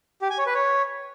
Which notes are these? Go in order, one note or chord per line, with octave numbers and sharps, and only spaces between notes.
G4
G#5
C#5
B4
C#5